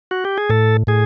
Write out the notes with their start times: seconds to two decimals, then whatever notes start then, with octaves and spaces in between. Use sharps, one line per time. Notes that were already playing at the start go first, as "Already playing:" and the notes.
0.11 F#4
0.25 G4
0.37 G#4
0.50 A2 A4
0.87 A2 G#4